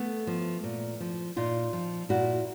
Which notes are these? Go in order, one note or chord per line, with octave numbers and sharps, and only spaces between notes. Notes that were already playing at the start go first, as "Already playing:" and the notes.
Already playing: A3 B3
F3
A#2
F3
A#2 D#4 F4
F3
A#2 E4 F#4